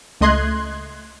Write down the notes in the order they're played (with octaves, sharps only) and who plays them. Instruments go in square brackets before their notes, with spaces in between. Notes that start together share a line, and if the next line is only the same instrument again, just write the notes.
[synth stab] C#2 A3 D#5 C6 F#6 G#6